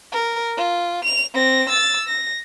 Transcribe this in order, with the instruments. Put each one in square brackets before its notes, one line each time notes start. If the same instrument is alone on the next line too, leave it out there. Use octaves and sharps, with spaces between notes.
[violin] A#4
F4
F7
C4 A#6
E6 A6
A#6